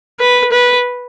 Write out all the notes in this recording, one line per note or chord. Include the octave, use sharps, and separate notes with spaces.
B4
B4